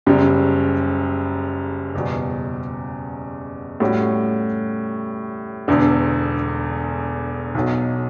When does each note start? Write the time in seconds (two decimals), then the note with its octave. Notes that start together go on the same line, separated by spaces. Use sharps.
0.06 F#1 F#2 C#3 G3
1.94 F#1 E2 B2 G3
3.80 A2 G3 C#4 F#4
5.68 E1 E2 D3
7.55 B1 B2 F#3